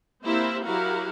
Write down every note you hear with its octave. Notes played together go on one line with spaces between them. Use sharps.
A#3 C4 E4 G4 C5 E5
F#3 E4 F#4 G4 A#4 F5